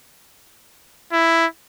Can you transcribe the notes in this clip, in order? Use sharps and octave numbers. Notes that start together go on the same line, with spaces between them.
E4